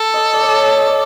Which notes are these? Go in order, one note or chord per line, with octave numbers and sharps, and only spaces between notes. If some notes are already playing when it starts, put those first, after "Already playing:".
Already playing: A4
D#5
D5
C#5
D#5
D5